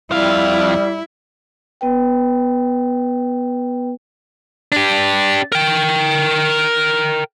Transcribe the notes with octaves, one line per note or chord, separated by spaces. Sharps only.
F2 G3 E4 F5
B3 B4 G5
D4 G4
A#4 G5